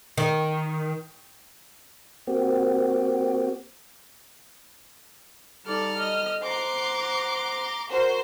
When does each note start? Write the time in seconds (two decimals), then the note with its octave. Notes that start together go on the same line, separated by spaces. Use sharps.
0.18 D#3
2.27 A#3 C4 F#4 G4
5.66 G3 D#4 A4 D5 F6
5.99 D#5
6.43 C5 F#5 A#5 C6 D6
7.90 F#4 A#4 C5 C6